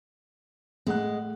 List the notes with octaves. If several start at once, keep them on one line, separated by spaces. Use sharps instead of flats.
A2 G#3 F#5 F#6